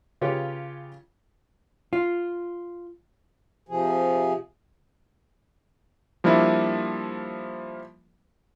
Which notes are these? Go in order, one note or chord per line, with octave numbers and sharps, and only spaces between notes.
C#3 F4 G4 B4 C#5
F4
C3 F3 G#4
F3 G3 A#3 D4 E4